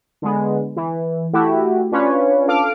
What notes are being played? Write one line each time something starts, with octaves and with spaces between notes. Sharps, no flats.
D3 G#3 B3
E3
A3 E4 F#4 G4
C#4 D4 F4 B4 C#5
A4 F5 D6 F6